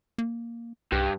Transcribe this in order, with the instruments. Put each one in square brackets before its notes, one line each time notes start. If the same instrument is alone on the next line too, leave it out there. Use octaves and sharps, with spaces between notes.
[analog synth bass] A#3
[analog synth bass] C2 [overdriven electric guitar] G2